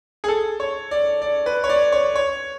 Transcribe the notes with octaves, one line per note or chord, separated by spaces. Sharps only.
G#4
A4
C#5
D5
D5
B4
C#5
D5
C#5
C#5